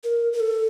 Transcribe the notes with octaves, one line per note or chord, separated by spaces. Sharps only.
A#4
A#4
A4